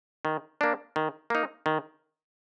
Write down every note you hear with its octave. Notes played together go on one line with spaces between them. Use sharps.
D#3
A#3 D4
D#3
A#3 D#4
D#3